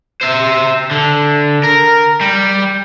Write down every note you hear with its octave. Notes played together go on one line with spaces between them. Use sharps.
C5 E5
D3
A#4
G3